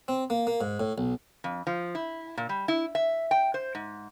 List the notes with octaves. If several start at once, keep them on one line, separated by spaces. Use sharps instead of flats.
C4
A#3
A#3
G#2
A2
B1
F2
F3
E4
A#2
G3
E4
E5
G5
C5
G#2